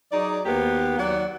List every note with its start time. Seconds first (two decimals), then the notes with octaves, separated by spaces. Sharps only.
0.12 F#3 D#4 G#4 D5
0.45 D#2 A#3 B3 F#4 G4 C5
0.97 D#2 F#3 D5 F#5